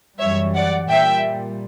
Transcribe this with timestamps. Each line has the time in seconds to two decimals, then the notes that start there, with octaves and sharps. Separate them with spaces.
0.20 F#2 E3 G3 C#5 E5
0.55 D5 F#5
0.89 A#2 G3 E5 G5